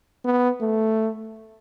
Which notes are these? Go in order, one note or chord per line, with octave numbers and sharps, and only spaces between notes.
B3
A3